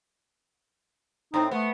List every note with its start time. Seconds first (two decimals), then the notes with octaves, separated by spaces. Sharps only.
1.34 A2 C4 D#4
1.51 A3 B3